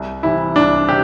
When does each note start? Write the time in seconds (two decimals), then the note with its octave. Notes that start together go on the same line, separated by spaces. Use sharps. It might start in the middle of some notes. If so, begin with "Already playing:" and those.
Already playing: C2
0.23 C3 E3 E4
0.56 C2 D4
0.88 C3 G4